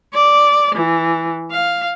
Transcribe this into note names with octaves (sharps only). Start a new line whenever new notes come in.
D5
E3
F5